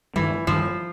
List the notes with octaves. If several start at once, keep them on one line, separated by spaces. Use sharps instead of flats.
G2 D#3 E3 G3
G2 D#3 F3 G3